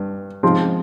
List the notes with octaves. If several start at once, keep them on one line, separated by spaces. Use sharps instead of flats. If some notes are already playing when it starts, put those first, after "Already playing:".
Already playing: G2
G#2 F3 G#3 C4